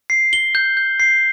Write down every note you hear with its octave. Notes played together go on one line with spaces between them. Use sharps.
C7
G7
G6
G6
C7